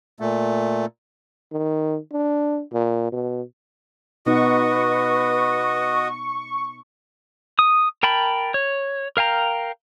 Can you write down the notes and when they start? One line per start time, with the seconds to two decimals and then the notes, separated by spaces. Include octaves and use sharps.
0.20 A#2 A3
1.52 D#3
2.13 D4
2.73 A#2
3.12 B2
4.26 B2 B3 D#4 F#4 B4 D#5 C#6
7.59 D#6
8.03 A#4 G5 A5 B5
8.54 C#5
9.17 A#4 F5 G5 A#5